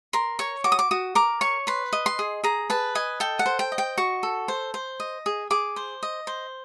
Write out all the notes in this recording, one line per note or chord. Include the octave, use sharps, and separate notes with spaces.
A#4 C6
C#5 C#6
F#4 D6
D#6
D6
F#4 D#6
A#4 D6
C#5 C#6
B4 C6
D#5
C6
G#4
G#4 A#5
B4 A5
D#5 G#5
A4 G5
F#5
C5
G5
D#5
G5
F#4 C#6
A4
C5
C5
D#5
G#4
G#4 D6
C5
D#5
C5